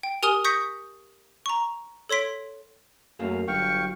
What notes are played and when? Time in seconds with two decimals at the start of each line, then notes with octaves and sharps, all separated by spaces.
0.03 G5
0.23 G4 A#4 G#5 D#6 F6 G7
0.44 C#6 D#6 G6 A#6 B6 C#7
1.46 A#5 C#6
2.09 A4 C#5 C6 B6 D7
3.19 F#2 A3 A#3 G#4 F5
3.48 G1 F#3 F5 G5 C#6 C#7